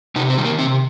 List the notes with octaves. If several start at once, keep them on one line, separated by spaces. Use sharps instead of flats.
C3 D#4
C4
D#3 G3
A#3
C3 C4